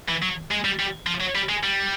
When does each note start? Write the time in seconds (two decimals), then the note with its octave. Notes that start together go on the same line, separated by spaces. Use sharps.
0.08 E3
0.22 F#3
0.51 G#3
0.65 G3
0.79 G3
1.07 F3
1.21 F#3
1.36 G3
1.49 G#3
1.63 G3